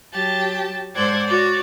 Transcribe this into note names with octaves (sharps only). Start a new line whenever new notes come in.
F#3 G4 A5
G#2 A4 C5 D5 F#5 G#6
F#4 C#5 D5